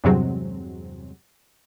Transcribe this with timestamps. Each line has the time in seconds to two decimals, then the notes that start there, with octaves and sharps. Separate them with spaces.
0.04 E2 G2 C3 F#3 G#3 C4